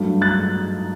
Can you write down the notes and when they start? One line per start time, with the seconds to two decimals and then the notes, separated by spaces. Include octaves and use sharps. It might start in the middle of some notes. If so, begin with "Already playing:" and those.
Already playing: G2 F#3 A3
0.21 F#6 A6